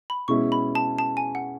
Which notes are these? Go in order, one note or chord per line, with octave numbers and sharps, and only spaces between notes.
B5
B2 G#3 C#4 E4 C#6
B5
A5
A5
G#5
F#5